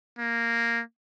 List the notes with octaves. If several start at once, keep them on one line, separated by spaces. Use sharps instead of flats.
A#3